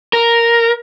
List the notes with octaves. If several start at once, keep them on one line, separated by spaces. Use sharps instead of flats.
A#4